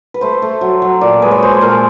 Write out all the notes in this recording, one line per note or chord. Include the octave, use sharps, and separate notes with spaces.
B4
A3 C5
A3
F#3
F#3
A#2 D5
G#3 B4
C#5
G#3 C5
A4
A#2 A#4